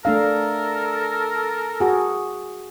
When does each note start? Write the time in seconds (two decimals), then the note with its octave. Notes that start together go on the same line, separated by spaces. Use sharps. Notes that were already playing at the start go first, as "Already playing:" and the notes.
0.05 A3 D4 A4 A#4 F5
1.80 F#4 G#4